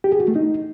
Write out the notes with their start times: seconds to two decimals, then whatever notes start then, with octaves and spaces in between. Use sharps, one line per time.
0.04 G4
0.12 G#4
0.20 F#4
0.28 A3
0.36 D#4